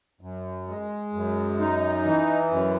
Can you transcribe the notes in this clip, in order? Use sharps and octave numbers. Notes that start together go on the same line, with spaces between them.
F#2
G#3
F#2
D#4
E3
F#2